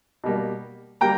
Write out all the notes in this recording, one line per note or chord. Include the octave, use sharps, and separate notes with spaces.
B2 G3 A#3
G3 A#3 G5 A#5